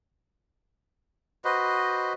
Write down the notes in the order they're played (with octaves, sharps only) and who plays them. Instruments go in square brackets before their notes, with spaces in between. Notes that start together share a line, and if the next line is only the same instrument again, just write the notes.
[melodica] F#4 B4 C5 D#5